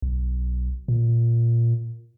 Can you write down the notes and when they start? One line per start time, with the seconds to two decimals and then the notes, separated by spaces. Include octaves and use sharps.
0.02 B1
0.88 A#2